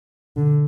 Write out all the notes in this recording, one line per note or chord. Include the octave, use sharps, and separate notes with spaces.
D3